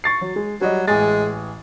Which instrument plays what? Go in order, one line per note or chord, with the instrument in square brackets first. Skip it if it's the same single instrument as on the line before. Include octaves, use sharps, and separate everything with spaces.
[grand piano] C#6 A6 C7
F#3
G#3
[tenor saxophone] F#3 [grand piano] G3 D#5
[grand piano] A1 G#5 A6 [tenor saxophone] G#3